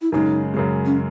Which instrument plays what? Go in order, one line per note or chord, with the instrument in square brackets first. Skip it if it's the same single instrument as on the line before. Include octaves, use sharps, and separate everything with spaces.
[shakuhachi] E4
[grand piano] F#2 C#3 G#3 [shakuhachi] D#4
[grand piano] F#2 C#3 G#3
[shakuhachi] C#4